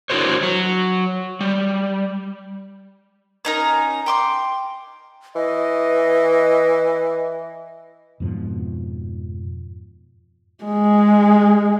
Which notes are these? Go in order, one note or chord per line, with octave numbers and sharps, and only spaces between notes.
D4 E4 F#4 A#4 C5 C#5
F#3
G3
C#4 D#4 A#4
G5 C6 D6
E3 D#5
F2 G#2 B2 F3
G#3